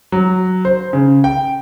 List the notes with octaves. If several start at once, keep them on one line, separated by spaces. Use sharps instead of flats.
F#3
C5
C#3
G5